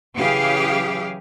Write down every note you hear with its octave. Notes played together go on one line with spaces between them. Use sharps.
C#3 E3 F#3 G4 G#4 F5